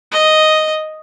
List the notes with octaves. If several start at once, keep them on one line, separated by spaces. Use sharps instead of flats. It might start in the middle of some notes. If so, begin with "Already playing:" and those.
D#5